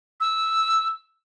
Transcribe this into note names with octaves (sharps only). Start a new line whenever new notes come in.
E6